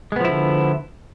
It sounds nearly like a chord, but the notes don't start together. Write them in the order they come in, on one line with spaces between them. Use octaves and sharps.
G#3 B3 F3 E4 D3